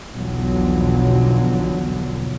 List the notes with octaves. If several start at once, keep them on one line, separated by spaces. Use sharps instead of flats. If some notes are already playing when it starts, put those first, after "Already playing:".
B1 E2 D3 F3 F#3